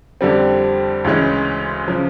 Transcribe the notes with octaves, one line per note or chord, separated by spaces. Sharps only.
F2 D3 G3 C4
D2 C#3 E3 G#3 C#4
C#3 F3